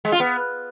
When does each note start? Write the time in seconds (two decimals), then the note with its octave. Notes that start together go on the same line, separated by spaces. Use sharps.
0.05 G#3
0.12 F4
0.20 B3